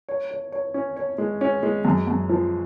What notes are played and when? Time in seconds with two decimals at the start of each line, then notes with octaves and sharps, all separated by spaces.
0.09 C#5
0.31 C#5
0.52 C#5
0.74 C#4
0.96 C#5
1.18 G#3
1.41 C#4
1.63 G#3
1.85 F#2
2.07 F#2
2.29 F3